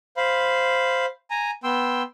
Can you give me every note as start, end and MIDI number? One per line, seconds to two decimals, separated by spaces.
0.17 1.06 72
0.17 1.06 77
0.17 1.06 83
1.31 1.51 80
1.31 1.51 82
1.64 2.02 59
1.64 2.02 79
1.64 2.02 84
1.64 2.02 88